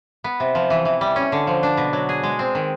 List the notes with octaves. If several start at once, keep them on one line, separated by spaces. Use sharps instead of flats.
B3
C3
F3
E3
E3
G3
C#4
D3
F3
D4
B2
F#3
G#4
G#3
C4
D#3